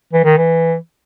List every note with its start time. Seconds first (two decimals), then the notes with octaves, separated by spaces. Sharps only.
0.13 E3
0.24 D#3
0.37 E3